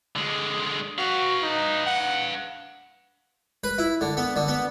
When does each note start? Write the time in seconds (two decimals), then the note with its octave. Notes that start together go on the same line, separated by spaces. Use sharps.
0.16 D3 G#3
0.98 F#4 B4 F5
1.42 D#4
1.86 F#5
3.64 B4
3.78 E4
4.01 D3
4.17 B3
4.36 D3
4.48 B3